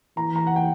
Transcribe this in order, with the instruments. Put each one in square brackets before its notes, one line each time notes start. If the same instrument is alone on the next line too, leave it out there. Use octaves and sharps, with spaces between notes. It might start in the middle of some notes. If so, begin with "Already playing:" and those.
[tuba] E3 [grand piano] A#5
[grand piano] A#5
F#5
G5